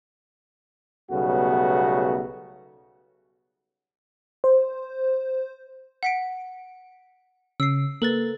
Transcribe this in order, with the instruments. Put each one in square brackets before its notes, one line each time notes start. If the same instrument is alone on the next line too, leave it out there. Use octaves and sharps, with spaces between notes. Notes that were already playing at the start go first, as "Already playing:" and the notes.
[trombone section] B1 C#3 G3 A3 B3 F#4
[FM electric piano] C5
[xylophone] F#5 B6 D7
[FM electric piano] C#3 [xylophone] E6 C7
[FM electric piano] A#3 [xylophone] A4 B4 A6